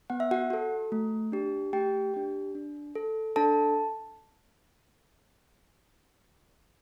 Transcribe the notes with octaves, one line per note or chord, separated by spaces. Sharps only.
B3 F#5
E5
F#4 F#5
F#4 A4
A3
D4 G4
A3 G4 G5
D4 G4
D4
A4
D4 A4 A5